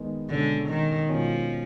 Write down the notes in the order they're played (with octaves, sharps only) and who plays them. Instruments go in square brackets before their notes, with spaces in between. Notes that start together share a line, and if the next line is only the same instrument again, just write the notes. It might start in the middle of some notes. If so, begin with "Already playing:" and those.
Already playing: [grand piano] D#3 G#3 B3 D#4
[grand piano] B2 G#3 C#4 [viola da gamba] D3
[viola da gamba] D#3
[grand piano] B2 G#3 C#4 [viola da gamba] F3